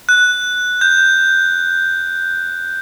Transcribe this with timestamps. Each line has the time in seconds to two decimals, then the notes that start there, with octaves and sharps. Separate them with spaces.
0.09 F#6
0.81 G6